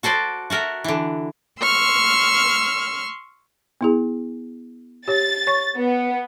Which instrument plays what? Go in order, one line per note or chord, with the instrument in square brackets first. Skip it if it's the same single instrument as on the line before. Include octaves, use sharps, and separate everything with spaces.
[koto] F#4 A4 C5 D5
F#4 A4 A#4 E5
D3 E3
[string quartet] C6 C#6 E6 F6
[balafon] B3 E4 G#4
[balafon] G4 C#5 [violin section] A6
[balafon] C#5 C#6
[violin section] B3